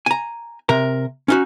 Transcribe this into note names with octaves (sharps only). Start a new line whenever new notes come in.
G#5 A#5
C3 A#4 A#5
C#4 D#4 F#4